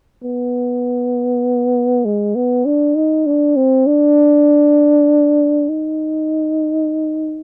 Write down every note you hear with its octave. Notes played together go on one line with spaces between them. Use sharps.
B3
G#3
B3
D4
D#4
D4
C4
D4
D#4